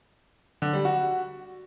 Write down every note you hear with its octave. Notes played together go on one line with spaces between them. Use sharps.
D3
G3
F#4